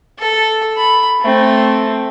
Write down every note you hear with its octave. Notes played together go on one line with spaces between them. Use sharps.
A4
B5
A3 C4